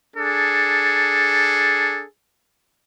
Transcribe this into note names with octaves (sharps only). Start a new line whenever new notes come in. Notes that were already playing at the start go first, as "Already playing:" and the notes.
D4 G#4 A4